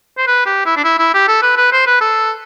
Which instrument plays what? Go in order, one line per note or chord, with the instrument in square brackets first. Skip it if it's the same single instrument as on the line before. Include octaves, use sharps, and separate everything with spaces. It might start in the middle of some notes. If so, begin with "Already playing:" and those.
[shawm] C5
B4
G4
E4
D4
E4
E4
G4
A4
B4
B4
C5
B4
A4